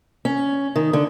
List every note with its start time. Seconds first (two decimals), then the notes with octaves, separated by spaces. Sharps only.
0.25 C#4
0.76 D#3
0.93 D3